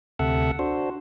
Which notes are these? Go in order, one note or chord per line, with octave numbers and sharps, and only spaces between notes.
D2 C3 A4 E5 F#5
D4 F#4 C5